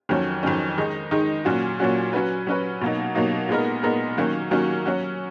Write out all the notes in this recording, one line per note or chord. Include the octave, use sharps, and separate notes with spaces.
F2 D#3 F#3 C#4
F2 D#3 F#3 C#4
D#3 G#3 D#4
D#3 G#3 D#4
A#2 F#3 C#4 F#4
A#2 F#3 C#4 F#4
F#3 C#4 F#4 B4
F#3 C#4 F#4 B4
B2 F#3 A#3 D#4
B2 F#3 A#3 D#4
A#2 G#3 B3 D#4 A#4
A#2 G#3 B3 D#4 A#4
D#3 F#3 A#3 C#4 F#4
D#3 F#3 A#3 C#4 F#4
F#3 C#4 F#4